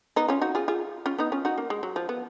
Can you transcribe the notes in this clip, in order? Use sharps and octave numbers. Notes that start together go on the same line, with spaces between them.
B3 D#4
C#4 F4
D#4 F#4
F4 G#4
F4 G#4
C#4 F4
B3 D#4
C#4 F4
D#4 F#4
A#3
G#3
F#3
F3
B3